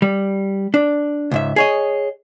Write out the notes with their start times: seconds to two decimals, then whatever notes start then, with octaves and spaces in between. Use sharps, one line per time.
0.02 G3
0.74 D4
1.31 C#2 G#2 E5
1.56 G#4 C#5 D#5